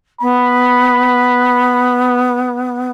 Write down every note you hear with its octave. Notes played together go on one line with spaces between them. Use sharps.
B3 B5